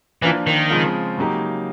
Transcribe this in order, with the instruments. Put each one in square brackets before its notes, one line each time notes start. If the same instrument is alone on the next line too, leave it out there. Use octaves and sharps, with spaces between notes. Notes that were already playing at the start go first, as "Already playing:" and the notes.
[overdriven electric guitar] E3 [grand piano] F3 A#3 D4 F4
[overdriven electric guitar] D#3
[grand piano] C#3 F3 G#3 C4 F4
C#3 F#3 A#3 D#4 G4